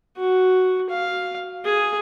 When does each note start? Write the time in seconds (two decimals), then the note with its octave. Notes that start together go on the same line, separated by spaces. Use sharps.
0.17 F#4
0.90 F5
1.65 G#4